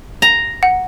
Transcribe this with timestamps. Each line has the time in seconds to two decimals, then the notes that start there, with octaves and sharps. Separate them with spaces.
0.22 A#5
0.63 F#5